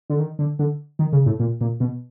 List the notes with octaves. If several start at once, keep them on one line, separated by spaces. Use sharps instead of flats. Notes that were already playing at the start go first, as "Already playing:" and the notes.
D3
D#3
D3
D3
D#3
C#3
A2
A#2
A#2
B2